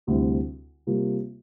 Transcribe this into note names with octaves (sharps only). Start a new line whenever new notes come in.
D2 C3 G3 C4 E4
C3 G3 A#3 F4